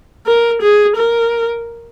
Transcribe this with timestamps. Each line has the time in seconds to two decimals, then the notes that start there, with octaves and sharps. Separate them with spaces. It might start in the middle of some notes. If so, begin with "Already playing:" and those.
0.27 A#4
0.62 G#4
0.96 A#4